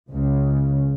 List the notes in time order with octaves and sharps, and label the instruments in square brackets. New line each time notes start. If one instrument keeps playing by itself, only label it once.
[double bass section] C#2 C#3